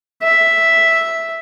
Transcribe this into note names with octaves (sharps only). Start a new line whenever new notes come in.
E5